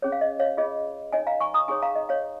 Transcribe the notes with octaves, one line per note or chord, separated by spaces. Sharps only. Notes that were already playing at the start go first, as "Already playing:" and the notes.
C#4 G#4 C#5
F5
D#5
C#5 F5
F4 G#4 C#5 D#5
D#4 C#5 D#5 G#5
F5 A#5
G#5 C#6
A#5 D#6
D#4 G#4 C#5 G#5 C#6
F5 A#5
D#5
C#5 F5
C#5